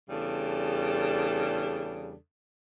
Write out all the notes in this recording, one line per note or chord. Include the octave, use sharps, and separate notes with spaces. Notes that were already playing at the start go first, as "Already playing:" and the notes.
E2 C#3 G3 D4 A4